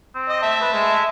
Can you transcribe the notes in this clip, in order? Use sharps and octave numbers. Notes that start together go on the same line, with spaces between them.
C4
D#5
E5 A5
B4
G#3